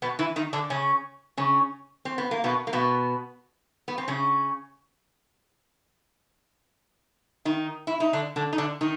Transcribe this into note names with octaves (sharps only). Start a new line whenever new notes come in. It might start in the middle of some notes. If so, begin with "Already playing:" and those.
B2 B3
E3 E4
D#3 D#4
D3 D4
C#3 C#4
C#3 C#4
C4
B3
A#3
B2 B3
A#3
B2 B3
B3
C4
C#3 C#4
D#3 D#4
E4
D#4
D3 D4
D3 D4
D#4
D3 D4
D#3 D#4